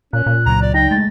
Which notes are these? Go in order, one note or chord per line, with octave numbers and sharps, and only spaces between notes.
A#2 C#4 F#6
A#2
C#2 F#3 A#5
D5
D#4 G5 A#6
G#3 A3 A6